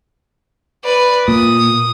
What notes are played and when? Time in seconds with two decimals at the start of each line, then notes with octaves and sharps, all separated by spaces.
0.85 B4 D5
1.28 A#2 D#6